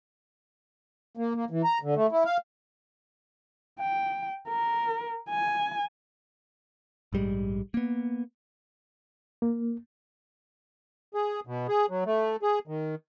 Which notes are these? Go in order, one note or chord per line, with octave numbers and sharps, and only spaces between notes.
A#3
A#3
E3
A#5
D3
A3
E4
F5
G5
A#4
G#5
A#1 G#2 G3 G#3
A#3 B3
A#3
G#4
B2
G#4
F#3
A3
G#4
D#3